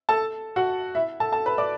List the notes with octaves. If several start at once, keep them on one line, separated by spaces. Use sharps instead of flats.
A4 A5
F#4 F#5
E4 E5
A4 A5
A4 A5
B4 B5
D5 D6